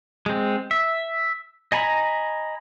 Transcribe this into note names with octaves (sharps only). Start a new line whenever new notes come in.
G#3 C4
E5
D#5 G#5 A#5 B5